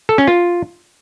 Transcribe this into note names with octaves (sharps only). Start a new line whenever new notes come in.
A4
C#4
F4